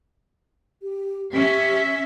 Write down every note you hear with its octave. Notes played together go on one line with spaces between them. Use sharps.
G4
C#4 G4 E5